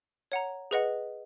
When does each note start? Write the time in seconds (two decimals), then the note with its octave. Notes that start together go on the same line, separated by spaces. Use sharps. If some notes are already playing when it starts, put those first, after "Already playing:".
0.32 C#5 F#5 A#5
0.71 G#4 B4 D#5 F#5